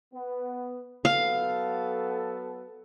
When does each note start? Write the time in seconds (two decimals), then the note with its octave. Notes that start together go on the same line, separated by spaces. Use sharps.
0.13 B3
1.05 F#3 B3 A4 F5